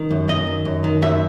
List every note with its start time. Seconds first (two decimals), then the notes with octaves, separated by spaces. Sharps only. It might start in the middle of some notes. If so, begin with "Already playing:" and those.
Already playing: D#3
0.11 F#2
0.28 F#2 D#5
0.47 D#3
0.65 F#2
0.84 D#3
1.02 F#2 E5